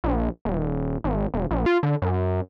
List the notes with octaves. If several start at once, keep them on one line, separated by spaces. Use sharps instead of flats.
A#1
D#1
G#1
E1
A#1
F4
D3
F#2